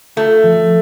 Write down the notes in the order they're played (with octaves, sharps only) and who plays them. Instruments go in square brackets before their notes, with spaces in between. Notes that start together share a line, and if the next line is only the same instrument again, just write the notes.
[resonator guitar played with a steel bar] A3 [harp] F4
[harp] F3